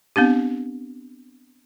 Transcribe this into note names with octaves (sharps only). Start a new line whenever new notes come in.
B3 C4 D4 G4